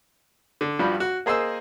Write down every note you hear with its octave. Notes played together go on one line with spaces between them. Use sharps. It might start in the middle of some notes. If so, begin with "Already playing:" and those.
D3
G2 F3 G3 F#4
F#4
A#3 G#4 C5 D#5 E6